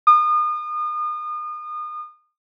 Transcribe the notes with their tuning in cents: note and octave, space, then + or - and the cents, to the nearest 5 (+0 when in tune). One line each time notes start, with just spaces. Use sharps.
D#6 -35